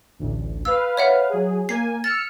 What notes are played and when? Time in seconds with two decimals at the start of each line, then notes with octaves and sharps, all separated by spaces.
0.19 A1 D2
0.65 B4 F5 E6
0.97 C#5 E5 F#5
1.29 F#3 G#4
1.69 A#3 G#5 C7
2.04 E6 F6 A6 C#7